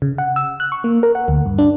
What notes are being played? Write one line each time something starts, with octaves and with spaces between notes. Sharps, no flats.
C#3
F#5
E6
F#6
C#6
A#3
A#4
F#5
D2
G2
D4